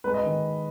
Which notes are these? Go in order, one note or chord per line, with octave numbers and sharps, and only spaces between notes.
G#3 B4
D#5
D#3